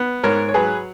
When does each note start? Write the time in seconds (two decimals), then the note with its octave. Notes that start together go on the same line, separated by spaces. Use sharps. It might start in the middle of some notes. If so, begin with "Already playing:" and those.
Already playing: B3
0.23 G#2 A#4 C#5
0.49 C#5
0.54 F#3 G#4 B4